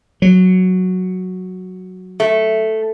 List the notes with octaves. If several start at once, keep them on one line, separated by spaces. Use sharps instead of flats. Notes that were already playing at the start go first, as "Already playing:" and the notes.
F#3
A3